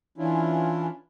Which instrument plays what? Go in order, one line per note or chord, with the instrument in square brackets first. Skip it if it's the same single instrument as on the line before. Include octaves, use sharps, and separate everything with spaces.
[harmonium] E3 C#4 D4 E4 F4